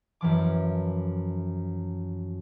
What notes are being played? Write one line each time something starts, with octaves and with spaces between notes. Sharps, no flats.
F#2 E3 F3 D6